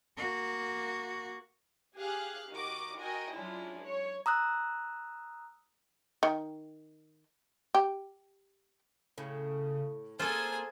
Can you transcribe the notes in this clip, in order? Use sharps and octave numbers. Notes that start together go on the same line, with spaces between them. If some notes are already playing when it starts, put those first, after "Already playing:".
A#3 F#4
G4 G#4 F5 F#6
D#3 F#4 D#5 D6
F#4 A#4 D#5 G5 G#5
F#3 G#3 C#4 D4 E4 F4
C#5
A#5 D#6 E6 F#6
D#3
G4
A2 C#3
A#3 C4 F4 G#4 A4 C5 G#5